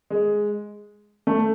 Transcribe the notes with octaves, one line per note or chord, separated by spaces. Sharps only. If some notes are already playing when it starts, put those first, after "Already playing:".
G#3
A3